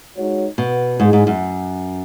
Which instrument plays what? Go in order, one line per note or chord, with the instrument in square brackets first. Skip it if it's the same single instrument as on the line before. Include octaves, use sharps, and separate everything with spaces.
[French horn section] G#3 D#4 F#4 C#5
[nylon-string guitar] B2
[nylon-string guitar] G#2 [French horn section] G#3 D#4 G#4
[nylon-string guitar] G#2
F#2